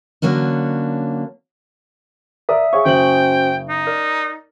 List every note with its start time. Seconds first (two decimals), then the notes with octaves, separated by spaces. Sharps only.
0.22 D3 F#3 A#3 C#4 D4
2.49 A#4 D5 E5 D#6
2.73 G#4 C#5 F5 C#6
2.86 F#1 C#4 F#4 C5 G5 F#7
3.69 D#4
3.87 A#4 D5